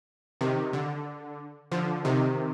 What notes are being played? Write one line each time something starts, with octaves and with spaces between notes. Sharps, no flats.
C3 D#3
D3
D3 F3
C3 D#3